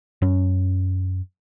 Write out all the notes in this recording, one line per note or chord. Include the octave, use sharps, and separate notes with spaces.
F#2 C#4